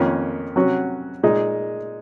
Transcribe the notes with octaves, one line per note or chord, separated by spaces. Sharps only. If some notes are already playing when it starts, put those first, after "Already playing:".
Already playing: F2 D#3 A#3 C#4 F4
C3 F#3 C#4 F#4
A#2 G#3 D#4